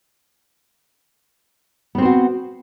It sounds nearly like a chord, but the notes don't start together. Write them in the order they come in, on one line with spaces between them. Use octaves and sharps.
B3 C4 C5 F#4